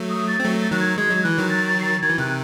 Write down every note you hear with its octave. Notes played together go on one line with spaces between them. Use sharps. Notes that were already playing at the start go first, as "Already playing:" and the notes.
Already playing: F#3 A3
D#6
A6
C4
F#3 A3
A6
D#3 F#3 F#6
G#6
G#3 G#6
F#3
E3 F#6
D#3 F#3
A6
A6
C7
A6
D#3 G#6
E3
C3 D#3 F#6